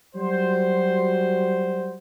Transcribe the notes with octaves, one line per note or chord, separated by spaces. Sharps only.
F#3 G3 F#4 C5